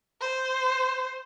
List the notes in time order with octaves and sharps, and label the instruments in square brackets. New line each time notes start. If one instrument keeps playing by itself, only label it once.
[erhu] C5